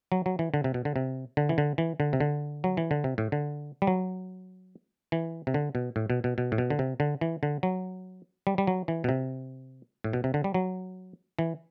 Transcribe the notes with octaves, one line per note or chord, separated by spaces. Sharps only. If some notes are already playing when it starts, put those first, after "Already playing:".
F#3
F#3
E3
D3
C3
B2
D3
C3
D3
E3
D3
E3
D3
C3
D3
F#3
E3
D3
C3
A2
D3
G3
F#3
E3
C3
D3
B2
A2
B2
B2
B2
A2
B2
D3
C3
D3
E3
D3
F#3
G3
G3
F#3
E3
B2
C3
A2
B2
C3
D3
G3
F#3
E3